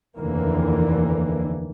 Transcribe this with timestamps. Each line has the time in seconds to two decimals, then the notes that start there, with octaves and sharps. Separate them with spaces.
0.18 F1 D#2 D3 E3 A#3